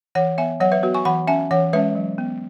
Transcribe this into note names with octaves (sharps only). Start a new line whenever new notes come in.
E3 C#5 F#5
B3 E5 G#5
F#3 C#5 F#5
B4 E5
B3 F#4 B4
G#5 C#6
E3 F#5 B5
C#4 E5 G#5
E3 C#5 F#5
G#3 C#4 B4 E5
F#3
B3